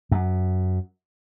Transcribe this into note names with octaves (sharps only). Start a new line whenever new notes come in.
F#2